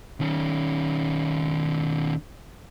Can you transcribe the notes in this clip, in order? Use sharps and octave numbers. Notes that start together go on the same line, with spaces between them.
D#3 C#4